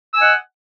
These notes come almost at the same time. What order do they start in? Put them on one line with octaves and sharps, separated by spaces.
E6 G#5 F#5 D#5